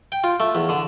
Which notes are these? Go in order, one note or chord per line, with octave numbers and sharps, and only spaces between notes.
G5
F4
A3
E2
D3